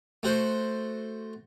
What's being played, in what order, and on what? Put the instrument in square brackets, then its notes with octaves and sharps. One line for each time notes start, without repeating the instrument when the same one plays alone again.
[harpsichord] A3 F#4 C5